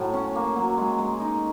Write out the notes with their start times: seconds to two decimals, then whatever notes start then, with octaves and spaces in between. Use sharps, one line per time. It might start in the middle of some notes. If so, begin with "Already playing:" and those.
Already playing: A2 F#3
0.14 C#4
0.35 A#3
0.56 F#3
0.77 G#3
0.99 G#3
1.20 D#4